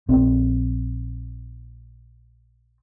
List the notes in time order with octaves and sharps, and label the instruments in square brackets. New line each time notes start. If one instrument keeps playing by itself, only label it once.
[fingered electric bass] A#1 C4